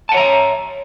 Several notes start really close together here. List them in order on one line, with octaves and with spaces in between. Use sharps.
A5 F#5 C#5 A#5 E5